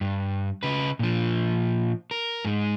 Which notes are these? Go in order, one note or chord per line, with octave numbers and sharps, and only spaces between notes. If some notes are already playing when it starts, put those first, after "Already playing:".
G2
C#3 B4
A#2 F3
A#4
G#2 G#3